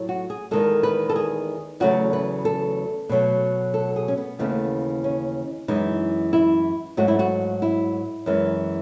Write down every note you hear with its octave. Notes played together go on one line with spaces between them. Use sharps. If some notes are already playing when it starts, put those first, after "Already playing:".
Already playing: A2 F#3
F#4
G#4
E2 D#3 G#3 A4
B4
A4
G#4
E2 C#3 F#3 A3 F#4
B4
A4
B2 F#3 A3
A4
G#4
C#4
B3
D#2 C#3 E3 A3 B3
C#4
F#2 E3 G#3 D#4
E4
G#2 F#3 A3 F#4
E4
F#4
E4
F#2 E3 G#3